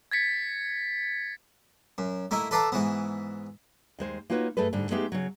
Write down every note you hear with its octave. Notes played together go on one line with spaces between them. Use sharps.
G#6 A6 B6 C#7
F#2
A3 A#3 D#4 E4
A4 B4 D5 F5 A5 A#5
G#2 E3 B3
D#2 G#3 C5
A#3 D#4 F4 F#4 B4 C#5
G2 A3 G#4 A4 B4
G#2 D3 G3
G#3 A3 B3 D#4 G4 G#4
C#3 F#3